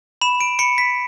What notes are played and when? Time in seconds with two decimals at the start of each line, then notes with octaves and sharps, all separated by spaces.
0.21 B5 E7
0.41 D7
0.59 B5 C#7
0.78 B6